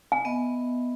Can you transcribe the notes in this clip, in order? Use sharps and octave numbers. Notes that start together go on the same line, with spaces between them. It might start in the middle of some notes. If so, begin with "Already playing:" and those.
G#5
B3 D#5 E5